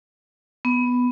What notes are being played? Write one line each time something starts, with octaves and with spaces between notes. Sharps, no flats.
B3